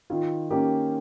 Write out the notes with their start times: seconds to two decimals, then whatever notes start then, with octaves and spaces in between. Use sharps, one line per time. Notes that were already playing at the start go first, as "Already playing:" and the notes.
0.10 D#3 F4
0.51 A#3 C#4 G4